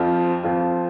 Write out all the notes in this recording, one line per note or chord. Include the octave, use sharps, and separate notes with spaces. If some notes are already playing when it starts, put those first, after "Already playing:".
Already playing: F2 F3 C4 F4
F2 F3 C4 F4